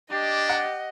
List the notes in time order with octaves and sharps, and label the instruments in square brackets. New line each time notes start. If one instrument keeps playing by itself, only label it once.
[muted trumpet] D4 [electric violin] G4 [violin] D#5
[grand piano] F#5